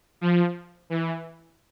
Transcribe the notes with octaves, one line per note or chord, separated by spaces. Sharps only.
F3
E3